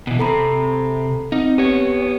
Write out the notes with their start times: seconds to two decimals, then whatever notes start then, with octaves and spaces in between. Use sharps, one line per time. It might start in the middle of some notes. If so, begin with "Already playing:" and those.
0.07 B2 E3
0.19 C3 C4 A4 A#5 B5
1.32 C4 D#4
1.58 B3 G4 C#5